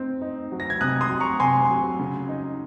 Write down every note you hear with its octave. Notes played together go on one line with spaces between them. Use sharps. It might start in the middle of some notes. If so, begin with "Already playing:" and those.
Already playing: C4 D#4
D#4
F#3
A#6
G#6
C3 D#6 F#6
C6 D#6
F#3
A#5 C#6
C3 G#5 C6
F#3
C#3
D#4